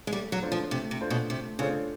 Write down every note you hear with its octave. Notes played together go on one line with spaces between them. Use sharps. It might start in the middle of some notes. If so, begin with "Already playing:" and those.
G#3
G3 A3
F#3
D4 F4 A4 C5
F3
C3 A3
C3
D4 F4 A4 C5
B2
C3 A3
C#3 D4 F4 A4 C5